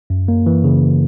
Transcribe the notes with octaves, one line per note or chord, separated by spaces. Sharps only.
F#2
A#3
E3
C#3